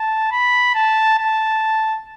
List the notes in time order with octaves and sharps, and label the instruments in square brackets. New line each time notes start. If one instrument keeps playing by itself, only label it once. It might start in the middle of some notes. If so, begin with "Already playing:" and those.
Already playing: [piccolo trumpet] A5
B5
A5
A5